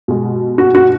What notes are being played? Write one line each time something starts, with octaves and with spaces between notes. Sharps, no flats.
B2 G#3
F#4
F#4